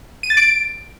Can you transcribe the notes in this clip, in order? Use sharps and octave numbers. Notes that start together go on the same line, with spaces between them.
D#7
A6
D7